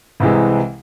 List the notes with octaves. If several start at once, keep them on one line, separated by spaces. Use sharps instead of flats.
C2 C3 E3 G#3